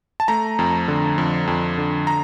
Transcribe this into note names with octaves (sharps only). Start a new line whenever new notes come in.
A5
A3 A#5
F2
D3
F2
F2
D3
A#5